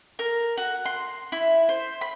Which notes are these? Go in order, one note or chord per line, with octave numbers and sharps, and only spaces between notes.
A#4
F#4
C6
E4
C5
B5